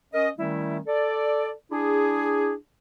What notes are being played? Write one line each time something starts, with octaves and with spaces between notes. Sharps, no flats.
C#4 A#4 D#5
D#3 G3 A3 C#4 E4
A4 D5
D4 E4 G#4